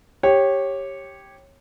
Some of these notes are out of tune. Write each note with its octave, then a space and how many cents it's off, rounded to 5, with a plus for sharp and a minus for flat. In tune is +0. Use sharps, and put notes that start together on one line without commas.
G4 +0 C#5 -15